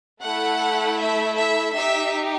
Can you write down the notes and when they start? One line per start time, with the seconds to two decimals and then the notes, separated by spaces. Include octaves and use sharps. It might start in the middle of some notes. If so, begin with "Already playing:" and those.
0.23 A3 E4 A4 F#5
0.99 E5
1.38 E5
1.75 D#4 G4 E5